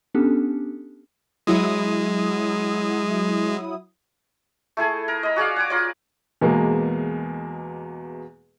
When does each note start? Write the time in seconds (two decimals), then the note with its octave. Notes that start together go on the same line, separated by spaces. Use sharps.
0.14 B3 C#4 D4 G4 A4
1.47 F#3 G#3 E4 D#6
4.77 A3 E4 G#4 A4
5.08 A#4
5.23 D#5 B5
5.36 F#4 G#4 D5 F5
5.56 F#5 G#5 D6
5.70 F4 A#4 C#5 D5
6.41 E2 B2 G#3 A#3